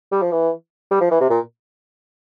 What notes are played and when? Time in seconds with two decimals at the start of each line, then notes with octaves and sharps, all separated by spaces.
0.12 G3
0.22 F3
0.31 E3
0.91 G3
1.01 F3
1.11 E3
1.20 C3
1.30 A#2